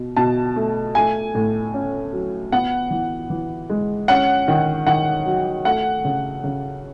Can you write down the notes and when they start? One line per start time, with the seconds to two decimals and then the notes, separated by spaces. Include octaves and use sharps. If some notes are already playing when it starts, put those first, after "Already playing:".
Already playing: B2
0.17 B2 A5
0.56 A3
0.95 A3 G#5
1.35 A2
1.74 C#4
2.13 F#3
2.52 B3 F#5
2.90 E3
3.30 E3
3.70 G#3
4.08 C#4 F#5
4.48 D#3
4.86 D#3 F#5
5.26 F#3
5.65 A3 F#5
6.05 C#3
6.44 C#3